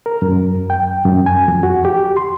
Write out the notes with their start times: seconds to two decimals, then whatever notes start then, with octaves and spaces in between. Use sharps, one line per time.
0.06 A#4
0.22 F#2
0.70 G5
1.05 F#2
1.26 G#5
1.48 F2
1.63 F#4
1.85 G4
2.17 C6